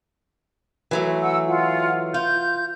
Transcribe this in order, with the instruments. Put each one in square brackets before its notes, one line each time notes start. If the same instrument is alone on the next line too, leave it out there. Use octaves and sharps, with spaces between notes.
[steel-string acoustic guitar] E3 F#3 A3
[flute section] F#5 E6
F4 F#5
[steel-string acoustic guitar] F4 [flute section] G6